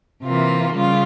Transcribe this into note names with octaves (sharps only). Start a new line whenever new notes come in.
C3 E3 A#3 F4
C#3 G3 F4